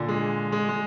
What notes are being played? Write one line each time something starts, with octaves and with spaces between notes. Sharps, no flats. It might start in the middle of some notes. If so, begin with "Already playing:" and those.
Already playing: A#2 D3
G#3
G#3
G#3